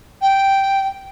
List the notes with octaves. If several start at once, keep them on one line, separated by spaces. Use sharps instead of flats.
G5